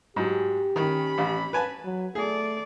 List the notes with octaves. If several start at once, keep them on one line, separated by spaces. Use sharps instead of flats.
G#2 F#3 G4
D#3 C#4 B5
A1
B4 G#5 A5
F#3
A3 G#4 A4 D5